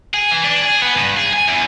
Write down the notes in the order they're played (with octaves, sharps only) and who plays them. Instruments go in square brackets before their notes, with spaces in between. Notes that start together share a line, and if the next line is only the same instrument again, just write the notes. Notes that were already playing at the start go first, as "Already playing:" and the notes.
[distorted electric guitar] G#4
E3
D4
G#4
B3
G2
G#4
G#5
E2